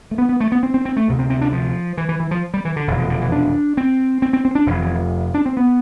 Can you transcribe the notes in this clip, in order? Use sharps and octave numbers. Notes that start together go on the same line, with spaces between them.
A3
B3
B3
A3
B3
C4
C4
C4
A3
D2 C3
C4
C4
D4
F3
E3
E3
E3
F3
G3
E3
D3
F1 E2 B2 E3
D3
D3
E3
D4
C4
C4
C4
C4
D4
F1 F2 C3 E3
E3
D4
C4
B3